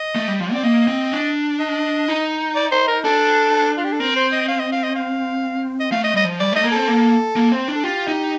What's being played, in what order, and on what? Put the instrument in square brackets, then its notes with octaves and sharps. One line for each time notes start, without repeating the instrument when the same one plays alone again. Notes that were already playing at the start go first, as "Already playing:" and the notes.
Already playing: [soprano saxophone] D#5
[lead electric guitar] A3
G3
F3
[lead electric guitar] C4 [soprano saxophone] D5
[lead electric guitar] A#3 [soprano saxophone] D#5
[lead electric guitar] C4
D4
[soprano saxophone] D#5
[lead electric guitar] D#4
[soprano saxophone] D5
C5
A#4
[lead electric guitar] D4 [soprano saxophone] A4
[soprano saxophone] F4
G4
A4
[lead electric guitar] C4 [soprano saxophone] A#4
[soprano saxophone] C5
D#5
F5
D#5
F5
D#5
F5
D#5
[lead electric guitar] A3 [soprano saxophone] F5
[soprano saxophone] D#5
[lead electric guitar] G3 [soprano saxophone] D#5
[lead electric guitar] F3
[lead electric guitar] G3 [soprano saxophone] D5
[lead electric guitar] A3 [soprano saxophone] D#5
[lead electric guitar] A#3
[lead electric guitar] C4 [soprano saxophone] A4
[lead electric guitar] A#3
A#3
C4
D4
[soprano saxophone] A4
[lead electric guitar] F4 [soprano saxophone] G4
[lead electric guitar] D#4